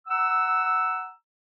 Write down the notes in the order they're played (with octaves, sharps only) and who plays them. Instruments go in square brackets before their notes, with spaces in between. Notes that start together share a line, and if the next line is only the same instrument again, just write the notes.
[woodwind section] F#5 A#5 E6